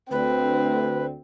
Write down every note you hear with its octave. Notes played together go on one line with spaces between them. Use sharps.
D2 C4 B4